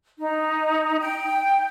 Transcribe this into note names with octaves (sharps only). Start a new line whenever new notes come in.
D#4
G5